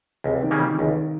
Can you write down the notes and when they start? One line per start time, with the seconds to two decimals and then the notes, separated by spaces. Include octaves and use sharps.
0.24 C#2 C3
0.43 D#3
0.51 C#3 G3 A#3 C#4
0.60 D#3
0.78 C#2 D#3